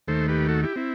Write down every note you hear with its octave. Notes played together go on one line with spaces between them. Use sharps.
D#2 D#3 A3 A4 C5
G4 B4
F#4 A4
E4 G4
C4 E4